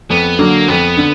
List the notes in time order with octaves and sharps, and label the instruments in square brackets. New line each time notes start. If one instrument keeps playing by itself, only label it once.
[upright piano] F2 [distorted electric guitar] B3
[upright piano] D3 F#3 [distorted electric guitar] A#3
[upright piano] F2 [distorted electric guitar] B3
[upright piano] D3